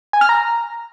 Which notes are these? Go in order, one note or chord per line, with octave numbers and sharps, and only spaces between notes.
G#5
F6
A#5